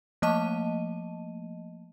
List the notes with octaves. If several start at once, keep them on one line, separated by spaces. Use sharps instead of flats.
F3 A3 A#3 D#5 A5 D#7